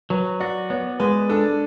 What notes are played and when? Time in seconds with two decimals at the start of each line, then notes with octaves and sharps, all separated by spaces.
0.10 F#3 B4
0.40 F#4 D5
0.70 B3 C#5
1.00 G#3 B4
1.29 D4 A4